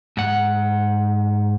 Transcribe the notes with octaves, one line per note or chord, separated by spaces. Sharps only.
G#2 F#5